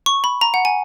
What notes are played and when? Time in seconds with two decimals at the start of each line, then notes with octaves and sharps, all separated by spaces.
0.06 C#6
0.24 B5
0.41 A#5
0.54 F#5
0.65 G#5